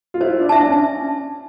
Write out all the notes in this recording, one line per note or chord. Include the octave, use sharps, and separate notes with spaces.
F4
E4 C5
D4
E5 A5
D4
C#4